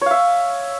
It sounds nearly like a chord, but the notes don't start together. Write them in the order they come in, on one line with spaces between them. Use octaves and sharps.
C#5 F5 E5